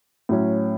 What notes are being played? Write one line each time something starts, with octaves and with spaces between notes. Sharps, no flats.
A2 F#3 C#4